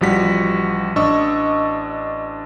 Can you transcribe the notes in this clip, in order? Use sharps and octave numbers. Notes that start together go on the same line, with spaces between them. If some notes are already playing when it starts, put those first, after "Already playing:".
A1 F3 G3 F#4 B6
A1 D4 D#5 C#6 E6